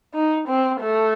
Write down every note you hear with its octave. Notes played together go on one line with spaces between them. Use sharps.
D#4
C4
A3